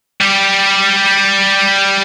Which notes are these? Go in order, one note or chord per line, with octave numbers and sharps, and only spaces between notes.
G3 G4